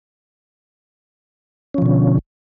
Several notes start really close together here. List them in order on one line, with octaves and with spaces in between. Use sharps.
C#4 F3 B2 D3